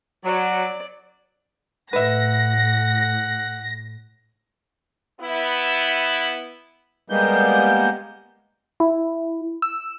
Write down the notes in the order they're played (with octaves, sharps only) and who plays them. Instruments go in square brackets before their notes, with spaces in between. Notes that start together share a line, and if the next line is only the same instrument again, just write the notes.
[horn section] F#3 [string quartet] D5
[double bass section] A2 [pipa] B4 E5 [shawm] F#5 [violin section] A#6
[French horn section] B3 E4
[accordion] G3 G#3 A#3 B3 G6
[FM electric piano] E4
E6